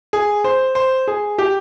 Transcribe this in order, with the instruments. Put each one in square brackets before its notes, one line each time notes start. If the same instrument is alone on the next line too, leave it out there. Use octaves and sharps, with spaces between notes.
[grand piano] G#4
C5
C5
G#4
G4